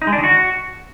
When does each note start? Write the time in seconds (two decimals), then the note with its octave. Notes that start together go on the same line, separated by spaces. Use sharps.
0.02 D#4
0.07 G#3
0.13 D4
0.18 D#3
0.24 F#4